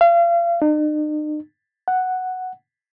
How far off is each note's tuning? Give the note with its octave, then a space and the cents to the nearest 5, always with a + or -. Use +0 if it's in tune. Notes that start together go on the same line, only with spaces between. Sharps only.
F5 -35
D#4 -45
F#5 +0